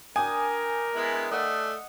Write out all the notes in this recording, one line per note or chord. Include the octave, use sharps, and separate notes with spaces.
D4 A#4 G5 G#5 D#6
G#3 B3 E4
A3 D4 D#5 F#5